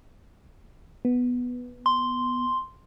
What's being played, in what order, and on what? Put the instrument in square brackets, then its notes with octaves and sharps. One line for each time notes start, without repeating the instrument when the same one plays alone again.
[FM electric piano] B3
[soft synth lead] C6